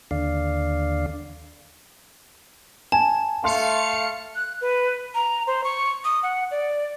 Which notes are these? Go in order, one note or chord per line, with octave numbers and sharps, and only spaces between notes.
D#2 D3 D5 F5
G#5 A5
A3 F5 C6 C#7
F#6
B4
A#5
C5
C#6
D#6
F#5
D5